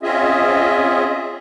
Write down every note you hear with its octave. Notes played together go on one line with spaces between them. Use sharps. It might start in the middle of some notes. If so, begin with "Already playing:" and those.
C4 C#4 F4 G#4 D#5 E5